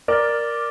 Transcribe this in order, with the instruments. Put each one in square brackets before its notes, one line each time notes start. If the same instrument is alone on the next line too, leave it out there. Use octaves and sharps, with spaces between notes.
[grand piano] A#4 D5 [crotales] D6 F6 A6